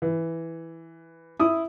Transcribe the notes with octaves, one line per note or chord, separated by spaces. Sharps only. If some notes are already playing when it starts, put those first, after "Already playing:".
E3
E4 D#6